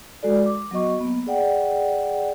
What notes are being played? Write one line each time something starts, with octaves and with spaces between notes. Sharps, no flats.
G#3 F#4 A4 D5
D6
F#3 B3 F#4 D#5 C#6
A#3 B3
G#4 D5 F#5 G5